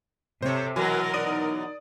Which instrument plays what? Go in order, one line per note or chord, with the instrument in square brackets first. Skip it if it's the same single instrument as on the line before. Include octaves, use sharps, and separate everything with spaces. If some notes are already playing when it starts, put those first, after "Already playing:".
[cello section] C3 A4 [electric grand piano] C5 C#5
[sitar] B2 E3 F#3 [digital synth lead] F#4 [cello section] A#4 [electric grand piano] G#5
[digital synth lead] D#4 [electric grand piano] D5 D#6 D#7